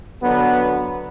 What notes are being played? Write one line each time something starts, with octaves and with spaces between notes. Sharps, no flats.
D3 F#3 B3